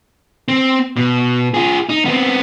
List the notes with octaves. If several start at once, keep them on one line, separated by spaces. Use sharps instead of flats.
C4
B2
F4 G#4
D#4
B3 C4